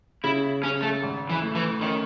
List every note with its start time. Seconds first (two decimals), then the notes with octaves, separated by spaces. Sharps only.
0.24 C#3 E4
0.63 C#3 C#4
0.83 A3
1.03 G#1
1.29 E3
1.42 A3
1.55 E3
1.81 D#3 C#4